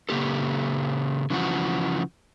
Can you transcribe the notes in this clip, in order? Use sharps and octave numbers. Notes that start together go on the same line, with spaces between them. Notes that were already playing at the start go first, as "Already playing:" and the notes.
C#3 A#3 G4 A4
C#3 E3 F3 F#4